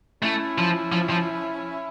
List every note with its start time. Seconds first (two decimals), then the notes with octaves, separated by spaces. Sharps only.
0.22 A3 C#4 E4
0.58 F3
0.92 F3
1.10 F3